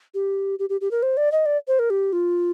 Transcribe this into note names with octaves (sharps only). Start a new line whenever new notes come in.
G4
G4
G4
G4
A#4
C5
D5
D#5
D5
C5
A#4
G4
F4